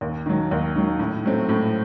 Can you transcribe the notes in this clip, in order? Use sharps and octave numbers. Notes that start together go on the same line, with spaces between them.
D#2
D#3 F#3
D#2
D#3 F#3
A2
F#3 A3 C4
A2